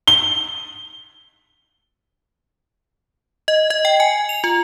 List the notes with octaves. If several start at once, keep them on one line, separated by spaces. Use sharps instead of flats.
G7
D#5
D#5
G5
G#5
F7
F4